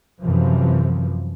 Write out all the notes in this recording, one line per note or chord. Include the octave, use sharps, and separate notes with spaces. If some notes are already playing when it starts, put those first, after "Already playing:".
F#2 C3 E3 F3